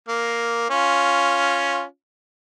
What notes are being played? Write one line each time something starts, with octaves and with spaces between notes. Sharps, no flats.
A#3
C#4 F4